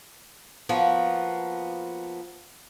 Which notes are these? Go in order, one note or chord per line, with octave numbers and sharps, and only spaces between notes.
F3 A#3 B3 F#4